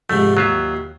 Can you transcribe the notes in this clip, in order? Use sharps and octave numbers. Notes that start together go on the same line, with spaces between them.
F2 G#2 C3 A3
D#2 F#3 F4 E5